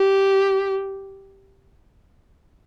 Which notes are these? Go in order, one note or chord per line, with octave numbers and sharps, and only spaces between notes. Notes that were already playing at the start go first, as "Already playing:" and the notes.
Already playing: G4